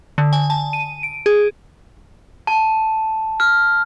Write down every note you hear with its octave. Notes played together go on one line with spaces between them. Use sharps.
D3
G#5
A5
D#7
D7
G#4
A5
F6